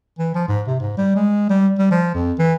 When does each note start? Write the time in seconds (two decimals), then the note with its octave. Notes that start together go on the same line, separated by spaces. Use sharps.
0.19 E3
0.35 F3
0.48 G#2
0.67 C3
0.80 G#2
0.97 G3
1.16 G#3
1.49 G3
1.78 G3
1.91 F3
2.15 F2
2.39 E3